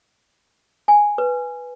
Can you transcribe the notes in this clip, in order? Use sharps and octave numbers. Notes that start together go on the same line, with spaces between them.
G#5
B4